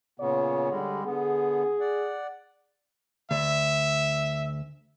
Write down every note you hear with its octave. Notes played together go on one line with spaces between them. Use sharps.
A#2 C#3 B3 C#5
D3 G3 G#3
D3 B3 G#4
D5 F#5
D2 E5